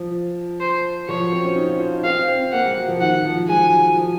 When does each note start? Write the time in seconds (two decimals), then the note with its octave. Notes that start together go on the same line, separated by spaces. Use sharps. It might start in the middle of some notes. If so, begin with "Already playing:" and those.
Already playing: F3
0.60 C5
1.09 F3 C#5
1.21 F#3
1.32 C4
1.45 C#4
1.56 D#4
1.68 F4
1.80 C5
1.93 D#4
2.04 C4 F5
2.28 C4
2.52 A#3 F#5
2.65 G#3
2.77 F#3
2.88 F3
3.01 D#3 F#5
3.13 D#3
3.25 F3
3.37 F#3
3.49 G#3 G#5
3.72 F#3
3.97 F3